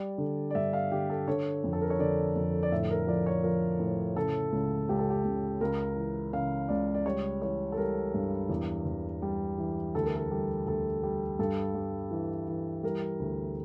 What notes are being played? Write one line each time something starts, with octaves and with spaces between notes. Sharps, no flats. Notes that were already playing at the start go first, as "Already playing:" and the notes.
Already playing: G3 D5
D3
D5
G2 E5
F5
D3 G4
A4
D3 C#5
F2
A4
A#4
C#5
D3 D5
F2
D5
A2 E5
A#4
F3 D5
C#5
F3 A#4
A2
C#3 A4
C#2
C#2 G4
A4
G4
C#2
C#2 A#4
E3
C#3 F5
C#2 D5
D5
G3 C#5
E3 C#5
A4
G3 A#4
G2
E2
E2
G3
E3
D2 A4
A#4
A4
G3
D2 A4
G3
G2 A4
G3
E3
E3
G3 A#4
D2